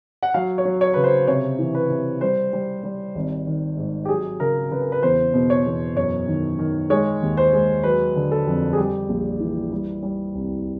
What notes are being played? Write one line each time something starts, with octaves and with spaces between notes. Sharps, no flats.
F#5
F#3 F5
C#5
F#3
C#5
C#3 B4
C5
C3 C#5
E3
B4
C3
G3 C5
G3
G3
G#1
D#3
G#2
G4
F#3 G#4
C#3 A#4
C#3 B4
A#4
B4
E2 C5
B2
C#5
E2
F#2 C#5
D#3
D#3
G#3 C#5
D#2
C5
G#3
F#3 B4
D3
A4
F2
G#4
G3 G4
A#1
E3
G3
G3
C2